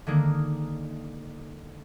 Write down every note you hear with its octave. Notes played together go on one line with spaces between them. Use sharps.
D3 D#3 G#3 A#3 G#4